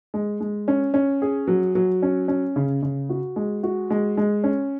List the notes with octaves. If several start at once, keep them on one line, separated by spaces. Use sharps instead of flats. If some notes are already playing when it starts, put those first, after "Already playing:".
G#3
G#3
C#4
C#4
G#4
F#3
F#3
C#4
C#4
C#3
C#3
F#4
G#3
F#4
G#3
G#3
C#4